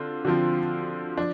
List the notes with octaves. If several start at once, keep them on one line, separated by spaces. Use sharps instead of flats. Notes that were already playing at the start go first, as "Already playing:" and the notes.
Already playing: D3 C4 F4
D3 F3 C4 F4
F3 D4